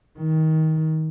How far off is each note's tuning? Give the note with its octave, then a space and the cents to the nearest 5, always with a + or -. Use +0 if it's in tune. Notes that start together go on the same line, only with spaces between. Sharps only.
D#3 +20